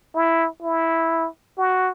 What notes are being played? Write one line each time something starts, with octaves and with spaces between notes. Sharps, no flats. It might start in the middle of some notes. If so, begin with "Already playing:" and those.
E4
E4
F#4